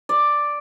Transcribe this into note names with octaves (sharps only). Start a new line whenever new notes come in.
D5